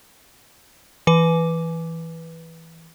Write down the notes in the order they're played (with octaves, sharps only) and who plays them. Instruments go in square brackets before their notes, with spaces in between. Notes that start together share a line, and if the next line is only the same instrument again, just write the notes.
[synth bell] E3 B4